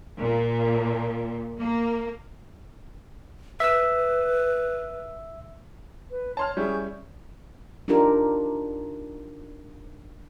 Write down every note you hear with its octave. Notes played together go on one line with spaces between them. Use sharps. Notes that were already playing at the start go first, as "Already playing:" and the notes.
A#2
A#3
B4 E5 E6
B4
C#5 A5 C6 F6
G3 C#4 E4 G#4 C#6 G6
D4 D#4 F4 G4 A#4